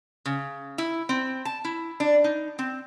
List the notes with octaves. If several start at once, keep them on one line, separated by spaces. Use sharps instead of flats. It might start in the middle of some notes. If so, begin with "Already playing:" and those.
C#3
E4
C4
A5
E4
D4
D#4
C4